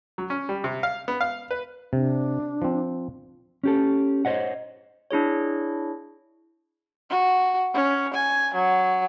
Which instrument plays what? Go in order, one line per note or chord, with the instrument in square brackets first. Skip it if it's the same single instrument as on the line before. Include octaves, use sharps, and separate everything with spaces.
[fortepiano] F#3
C#4
G3
C3
F5
B3
F5
B4
[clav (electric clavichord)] C3 [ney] D4
[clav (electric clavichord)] F3 C4
[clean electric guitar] C#4 G4 A4
C5 C#5 D#5 F#5
[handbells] D4 E4 G#4 C#5
[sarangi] F#4
C#4
G#5
F#3